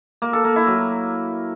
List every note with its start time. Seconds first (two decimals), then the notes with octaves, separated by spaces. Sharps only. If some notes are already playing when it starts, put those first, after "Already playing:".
0.22 A#3
0.33 A4
0.45 A#3
0.56 E4
0.67 F#3